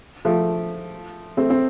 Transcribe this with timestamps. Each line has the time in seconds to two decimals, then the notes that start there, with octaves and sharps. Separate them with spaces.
0.25 F3 A3
1.37 A3 C4
1.50 C4